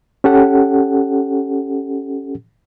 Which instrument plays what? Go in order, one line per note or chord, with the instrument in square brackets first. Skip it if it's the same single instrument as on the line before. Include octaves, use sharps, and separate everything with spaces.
[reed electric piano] C#4 G4 A4 F#5